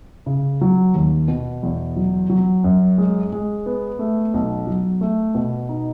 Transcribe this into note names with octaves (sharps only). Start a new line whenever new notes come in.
C#3
F#3
D#2
B2
E2
F#3
F#3
F#2
G#3
G#3
B3
A3
B1
F#3
A3
B2
D#4